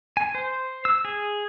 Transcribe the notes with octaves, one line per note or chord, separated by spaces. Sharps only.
G#5
C5
E6
G#4